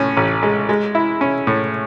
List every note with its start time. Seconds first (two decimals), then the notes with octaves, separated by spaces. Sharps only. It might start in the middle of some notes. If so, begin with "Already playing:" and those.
Already playing: A2 C#4
0.17 A1
0.43 G#3
0.69 G#3
0.95 E4
1.21 C#4
1.47 A2